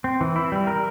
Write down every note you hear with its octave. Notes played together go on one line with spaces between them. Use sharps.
C4
E3
E4
G3
A#4